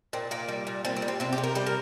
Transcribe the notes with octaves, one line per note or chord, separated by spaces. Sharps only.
A#2 C4
A#2 A#3
G3
A#2
G3 C4
C4
G3
C4
C3 C4
G4
C3
A#4
G3 C5
A#4